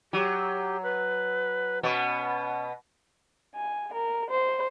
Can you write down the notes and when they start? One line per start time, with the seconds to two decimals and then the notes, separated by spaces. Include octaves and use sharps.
0.13 F#3 G4
0.83 B4
1.83 B2 B3 C#4
3.55 G#5
3.94 A#4
4.30 C5